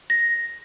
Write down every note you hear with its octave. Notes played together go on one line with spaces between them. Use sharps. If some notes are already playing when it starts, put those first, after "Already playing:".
A#6